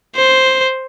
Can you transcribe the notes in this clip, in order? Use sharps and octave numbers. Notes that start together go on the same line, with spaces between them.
C5